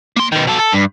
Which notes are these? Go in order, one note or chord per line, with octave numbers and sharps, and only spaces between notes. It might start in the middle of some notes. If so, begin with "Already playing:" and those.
A#3 C6
B2 D#3
B2 A4
A4
G2